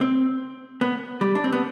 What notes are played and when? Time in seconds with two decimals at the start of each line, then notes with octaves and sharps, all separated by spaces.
0.01 C4
0.81 B3
1.21 G3
1.35 D4
1.44 C4
1.52 B3